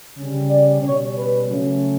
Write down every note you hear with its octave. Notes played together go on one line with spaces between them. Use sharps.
C#3 G3 C#4
D5
B2 G3 C#4 C#5
B4
C#3 F#3 A3 C#4